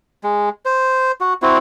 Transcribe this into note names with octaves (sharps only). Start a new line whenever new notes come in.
G#3
C5
F#4
C4 E4 F#4